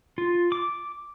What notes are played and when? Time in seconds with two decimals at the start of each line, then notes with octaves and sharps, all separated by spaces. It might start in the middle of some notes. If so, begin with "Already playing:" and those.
0.18 F4
0.52 D6